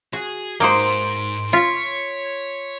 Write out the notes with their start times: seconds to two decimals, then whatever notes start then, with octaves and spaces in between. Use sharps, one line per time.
0.13 F#4 G#4
0.60 G#2 A#3 D#4 C5 C6 D7 G7
1.53 F4 C#5 B6 C#7